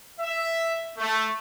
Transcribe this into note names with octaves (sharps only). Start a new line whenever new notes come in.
E5
A3